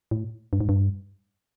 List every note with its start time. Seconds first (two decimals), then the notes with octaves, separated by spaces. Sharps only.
0.11 A2
0.53 G2
0.61 G#2
0.69 G2